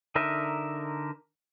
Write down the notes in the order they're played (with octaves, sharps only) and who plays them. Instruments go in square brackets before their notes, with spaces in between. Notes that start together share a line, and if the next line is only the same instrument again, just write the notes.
[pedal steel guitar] D3 D#4 A#4 E5